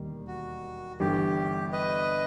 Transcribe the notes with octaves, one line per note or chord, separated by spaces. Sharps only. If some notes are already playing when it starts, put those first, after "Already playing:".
Already playing: E1 D#2 D#3 G3
F#4
G1 G2 E3 G3 G4
B4 D#5